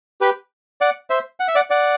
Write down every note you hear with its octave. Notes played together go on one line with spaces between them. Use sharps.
G4 B4
D5 F#5
C5 E5
F#5
E5
D5 F#5
D5 F#5